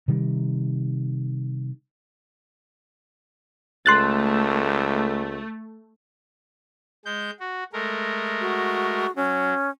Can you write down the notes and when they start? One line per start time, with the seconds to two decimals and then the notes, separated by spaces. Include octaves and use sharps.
0.08 C3 D#3 G3
3.86 C#2 A3 C6 F#6 A6
7.05 G#3 G6
7.40 F#4
7.73 G#3 A3 A#4
8.41 F#4
9.16 F#3 C#4